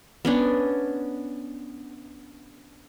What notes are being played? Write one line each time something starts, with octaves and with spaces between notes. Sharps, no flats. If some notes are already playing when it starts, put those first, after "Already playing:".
B3 C#4 D4